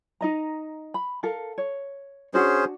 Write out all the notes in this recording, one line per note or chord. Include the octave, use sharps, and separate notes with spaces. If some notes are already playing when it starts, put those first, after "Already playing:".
D#4 D#5 A#5
B5
A4 A#4 F5
C#5
C#4 D4 F#4 G#4 C5 F#5